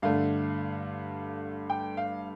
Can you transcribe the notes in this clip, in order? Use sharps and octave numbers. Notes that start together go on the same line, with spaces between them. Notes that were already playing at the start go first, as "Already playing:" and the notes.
G2 D3 A3 F5
G5
F5